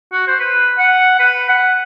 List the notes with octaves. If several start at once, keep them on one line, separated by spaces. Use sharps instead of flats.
F#4
C5
B4
F#5
B4
F#5